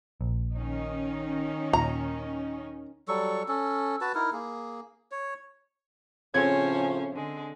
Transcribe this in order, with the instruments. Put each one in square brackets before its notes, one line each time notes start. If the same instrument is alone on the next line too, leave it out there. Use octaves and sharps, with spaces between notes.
[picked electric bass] A#1
[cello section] D#3 C#4 D#4
[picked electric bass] D#2 A#2 [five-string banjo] A#5
[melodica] F#3 G3 A4 C#6
C#4 A4
F#4 B4 A5
D#4 E4 A#4
A#3 G#4
C#5
[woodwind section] A2 C#3 F3 [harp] C4 C#5 G#6 [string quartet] C#4 C5
[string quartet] D3 G#3